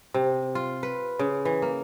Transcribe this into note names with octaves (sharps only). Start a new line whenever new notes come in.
C3
F4
B4
C#3
E3
A#3